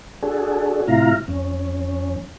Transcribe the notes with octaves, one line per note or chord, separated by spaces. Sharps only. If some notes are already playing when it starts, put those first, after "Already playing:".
D4 F#4 G#4 A4
A2 C3 E4 F4 F5 A#5
F2 C#4